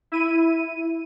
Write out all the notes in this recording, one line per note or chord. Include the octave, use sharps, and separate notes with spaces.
E4 D#7